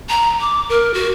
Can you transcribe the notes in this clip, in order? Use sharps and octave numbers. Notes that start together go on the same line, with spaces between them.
A#5
D6
A#4
F#4